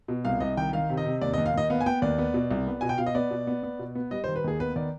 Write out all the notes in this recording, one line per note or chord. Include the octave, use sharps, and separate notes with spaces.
B2
C2 F5
C2 D#5
D#3 G5
D#3 F5
C3
D#5
C3
D#2 D5
D#5
D#2
F5
D#2 D#5
B3 F5
G#5
B3 G5
D#2 D5
B3
B2
C2
B3
B2 G#5
G5
B2 F5
D#5
B3 D5
B2
B3
B3
B2
B3
G3 D#5
C5
D#3
B4
D#2 G#4
B3 B4
D#3 D5